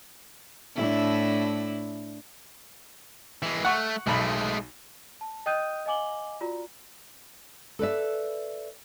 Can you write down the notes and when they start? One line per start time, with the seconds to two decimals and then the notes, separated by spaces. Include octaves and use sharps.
0.76 A2 D4 E4
3.42 E3 G#3
3.65 A3 F#5 C#6
4.07 B1 G#3 A3 B5
5.21 A5
5.46 D#5 G5 D#6 F#6 G6 D#7
5.86 D#5 F5 G#5 D6 F#7 G7
6.41 F4 F#4 D5 A#5
7.79 A4 B4 D5 E5